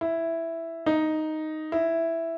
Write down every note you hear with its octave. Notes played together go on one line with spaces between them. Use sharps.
E4
D#4
E4